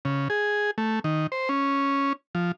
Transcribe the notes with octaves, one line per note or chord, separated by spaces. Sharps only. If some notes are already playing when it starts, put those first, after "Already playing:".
C#3
G#4
A3
D#3
C5
C#4
F3